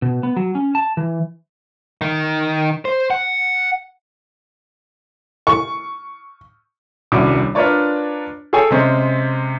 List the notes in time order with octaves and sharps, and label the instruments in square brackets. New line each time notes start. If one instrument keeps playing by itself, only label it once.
[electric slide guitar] B2
B3
F#3
C#4
A5
E3
[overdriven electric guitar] D#3
C5
F#5
[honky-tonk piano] C#6
[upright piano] D#1 C2 C#4 D4 F#4 D6
D4 F4 A#4 B4 C#5 D5
G#4 A4 C#5 G5 G#5
C3 G#3 C4 C#4